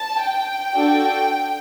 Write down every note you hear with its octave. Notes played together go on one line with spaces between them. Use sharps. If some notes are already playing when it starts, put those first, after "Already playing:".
Already playing: A5
G5
D4 F#4 A4